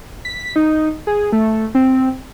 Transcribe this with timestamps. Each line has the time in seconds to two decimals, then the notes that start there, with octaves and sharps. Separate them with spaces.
0.25 B6
0.56 D#4
1.07 G#4
1.32 A3
1.75 C4